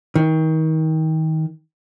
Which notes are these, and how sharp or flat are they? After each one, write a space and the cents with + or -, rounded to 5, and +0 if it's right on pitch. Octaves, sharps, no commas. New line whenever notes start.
D#3 +30